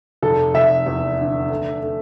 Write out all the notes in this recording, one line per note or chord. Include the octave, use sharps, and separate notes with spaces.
F1 A4
F1 E5
E2
D3
A3
A3